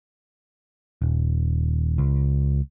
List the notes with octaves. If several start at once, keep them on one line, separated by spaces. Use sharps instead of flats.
D#1
C#2